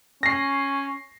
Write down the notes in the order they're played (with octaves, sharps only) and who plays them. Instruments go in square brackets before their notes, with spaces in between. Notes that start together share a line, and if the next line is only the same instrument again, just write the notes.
[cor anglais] C#4 [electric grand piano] A#6 C7